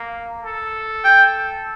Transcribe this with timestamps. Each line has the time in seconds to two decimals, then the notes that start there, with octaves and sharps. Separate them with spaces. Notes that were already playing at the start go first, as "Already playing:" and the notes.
Already playing: A#3
0.42 A4
1.04 G5